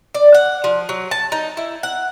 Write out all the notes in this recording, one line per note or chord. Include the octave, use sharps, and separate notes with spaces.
D5
F#5
F3
F#3
A5
D#4
E4
F#5